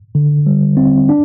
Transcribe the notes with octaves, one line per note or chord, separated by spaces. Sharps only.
D3
G3
C4
D4